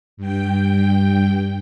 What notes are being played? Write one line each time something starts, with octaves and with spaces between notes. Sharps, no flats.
G2 G5